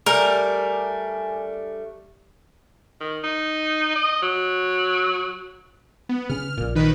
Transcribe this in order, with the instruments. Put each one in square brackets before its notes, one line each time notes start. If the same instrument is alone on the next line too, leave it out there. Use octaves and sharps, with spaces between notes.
[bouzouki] G3 A3 D4 [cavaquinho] A#4 [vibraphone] G#5
[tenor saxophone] D#3
D#4
D#5
F#3
[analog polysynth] B3
[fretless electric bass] C#3 C#4 [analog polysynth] F6
[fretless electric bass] A#1 A#2
[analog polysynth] D#3 B4